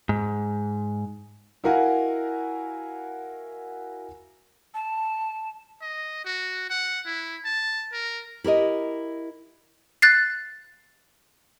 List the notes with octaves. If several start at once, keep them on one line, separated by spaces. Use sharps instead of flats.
G#2
E4 F#4 A#4 F5 F#5 G#5
A5
D#5
F#4
F#5
E4
A5
A#4
E4 G4 A#4 D#5
F#6 A6 C7